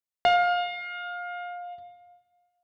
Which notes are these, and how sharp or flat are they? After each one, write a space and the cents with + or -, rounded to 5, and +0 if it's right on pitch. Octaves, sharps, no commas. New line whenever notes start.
F5 +20